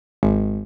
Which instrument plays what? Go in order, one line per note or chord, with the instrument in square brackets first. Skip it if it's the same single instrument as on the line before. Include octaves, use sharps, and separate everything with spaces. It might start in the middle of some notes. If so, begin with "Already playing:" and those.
[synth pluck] G#1